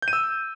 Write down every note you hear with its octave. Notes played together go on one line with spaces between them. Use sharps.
G6
D#7
E6